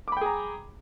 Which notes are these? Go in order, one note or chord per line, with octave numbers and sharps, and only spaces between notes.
G#4 G5 A#5 B5 D6